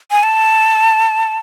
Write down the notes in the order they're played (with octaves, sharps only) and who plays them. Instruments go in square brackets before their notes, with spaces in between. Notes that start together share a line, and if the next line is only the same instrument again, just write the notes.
[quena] G#5
A5